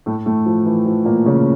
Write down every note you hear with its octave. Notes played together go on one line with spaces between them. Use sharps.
A2 A3
A2 A3
F3
E3
F3
A#2 A#3
C#3 C#4